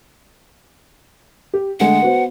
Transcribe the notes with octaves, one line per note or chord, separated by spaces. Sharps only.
G4
D3 G#3 A3 F#5
B3 F#4 C5